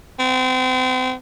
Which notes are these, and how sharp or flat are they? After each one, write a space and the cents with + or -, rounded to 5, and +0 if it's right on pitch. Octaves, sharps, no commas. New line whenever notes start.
C4 -35